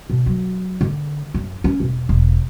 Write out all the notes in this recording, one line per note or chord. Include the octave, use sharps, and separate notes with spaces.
B2
F#3
D3
F#2
C#4
E1
E1